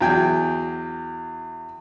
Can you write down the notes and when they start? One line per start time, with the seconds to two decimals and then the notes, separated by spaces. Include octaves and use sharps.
0.01 E2 F#3 G5 G#5